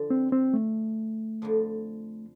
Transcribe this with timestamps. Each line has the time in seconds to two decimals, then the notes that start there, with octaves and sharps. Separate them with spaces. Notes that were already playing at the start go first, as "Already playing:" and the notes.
Already playing: D3 F3
0.10 C4
0.32 C4
0.54 A3
1.42 F2 D3 F3